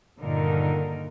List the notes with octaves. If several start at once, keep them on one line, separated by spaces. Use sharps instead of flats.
G2 A#2 D3 D#3 D#4 A#4